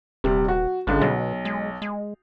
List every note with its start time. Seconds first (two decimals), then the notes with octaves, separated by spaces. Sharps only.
0.24 D#1 C3 G3
0.48 F#4
0.87 G#1 C#2 D3 G#3
1.01 B1 B2
1.45 G#3
1.82 G#3